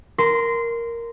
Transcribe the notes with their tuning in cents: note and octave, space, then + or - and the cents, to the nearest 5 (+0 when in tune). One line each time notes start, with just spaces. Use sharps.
A#4 +0 C6 -20